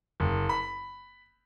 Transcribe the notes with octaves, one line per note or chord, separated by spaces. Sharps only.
F#1
B5